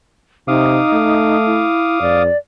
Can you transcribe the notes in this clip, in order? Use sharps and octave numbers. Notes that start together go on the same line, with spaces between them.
C3 D#4 F5 D6 D#6
A3
E4
F2 D5